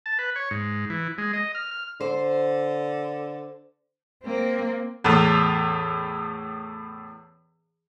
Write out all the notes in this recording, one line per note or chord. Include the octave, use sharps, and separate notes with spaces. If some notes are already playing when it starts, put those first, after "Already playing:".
A5
B4
C#5
G#2
E3
G#3
D#5
F6
F6
D3 C5
A#3 C4
E2 A2